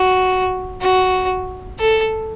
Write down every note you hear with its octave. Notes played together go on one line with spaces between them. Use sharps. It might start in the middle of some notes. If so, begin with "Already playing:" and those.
Already playing: F#4
F#4
A4